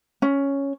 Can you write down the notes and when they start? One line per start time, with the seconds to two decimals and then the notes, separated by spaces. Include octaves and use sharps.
0.22 C#4